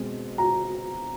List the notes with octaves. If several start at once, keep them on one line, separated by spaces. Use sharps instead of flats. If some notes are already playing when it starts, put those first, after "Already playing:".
Already playing: B2 G#3 C4
A#5